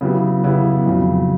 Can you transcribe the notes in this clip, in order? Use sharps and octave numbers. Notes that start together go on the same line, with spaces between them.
C#3 F#3 B3 E4 G4
C#3 F#3 B3 E4 G4
F2 C#3 F#3